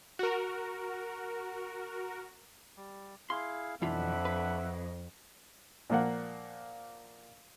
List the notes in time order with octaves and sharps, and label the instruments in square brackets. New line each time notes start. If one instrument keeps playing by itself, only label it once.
[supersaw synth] F#4 A#4
[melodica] G3
[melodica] E4 G#4 F5 [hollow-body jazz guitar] C6
[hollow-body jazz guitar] B1 E3 F4 [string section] F2 [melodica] D4 B5 [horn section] E5 F#5
[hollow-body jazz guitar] B4
[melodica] D#5
[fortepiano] A#2 F3 A#3 F#5